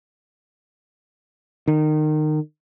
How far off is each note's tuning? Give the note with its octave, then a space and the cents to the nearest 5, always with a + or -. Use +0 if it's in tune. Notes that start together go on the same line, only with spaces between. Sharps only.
D#3 -25